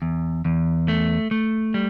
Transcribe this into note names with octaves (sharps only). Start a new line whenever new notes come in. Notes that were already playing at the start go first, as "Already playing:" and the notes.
E2
E2
A3
A3
G3